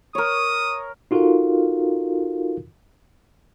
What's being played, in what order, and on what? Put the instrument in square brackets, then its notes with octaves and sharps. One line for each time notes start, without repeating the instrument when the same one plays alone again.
[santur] A#4 C#5 [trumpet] D#6
[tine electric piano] D#4 F4 F#4 A4 A#4 F5